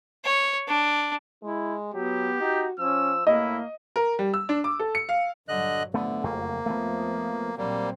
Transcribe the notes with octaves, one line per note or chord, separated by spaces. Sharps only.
C#5
D4
G#3 E4
F#3 B3 G4
D#4 F#4
F3 C#4 E6
A2 A#3 E4 D#5
A#4
G3
E6
D4
D6
A4
C#7
F5
A#1 G2 D3 F#3 D#5 F#6
A2 D3 F3 A3 B3
F#1 F2 A3 A#3
F2 F3 A3 B3
A#1 F#3 G3 A#3 C4